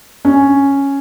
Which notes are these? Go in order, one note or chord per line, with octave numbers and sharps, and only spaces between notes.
C#4